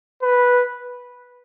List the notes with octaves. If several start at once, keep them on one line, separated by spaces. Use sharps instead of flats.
B4